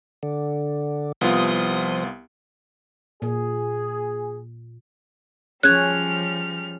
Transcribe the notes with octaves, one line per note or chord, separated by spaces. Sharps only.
D3
C2 F3 B3 F4 D#6
A#2 G#4
F3 G3 C#4 G#4 C#5 F6 F#6 G#6